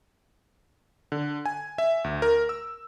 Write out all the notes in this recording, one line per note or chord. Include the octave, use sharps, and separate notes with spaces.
D3
G#5
E5
D2
A#4
E6